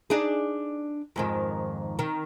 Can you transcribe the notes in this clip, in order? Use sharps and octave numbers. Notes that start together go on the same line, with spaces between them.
D4 D#4 G#4
F2 G#2 D#3
D#3